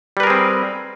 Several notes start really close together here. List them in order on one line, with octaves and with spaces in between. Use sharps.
G3 B4 A#4 G#4 C4